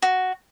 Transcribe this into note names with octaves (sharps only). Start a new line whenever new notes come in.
F#4